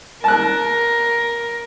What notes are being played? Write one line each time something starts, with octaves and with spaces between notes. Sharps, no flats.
A#4 A5 F#6